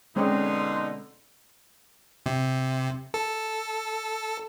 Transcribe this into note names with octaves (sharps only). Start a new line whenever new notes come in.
B2 D3 G#3 C4 C#4 D#4 C6
C3
A4